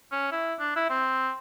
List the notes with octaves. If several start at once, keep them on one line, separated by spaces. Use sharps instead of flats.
C#4
E4
D4
E4
C4